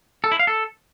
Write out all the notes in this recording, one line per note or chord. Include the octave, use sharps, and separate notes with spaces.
A4
E4
F5
A4